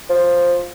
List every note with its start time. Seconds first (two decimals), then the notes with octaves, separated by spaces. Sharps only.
0.10 F3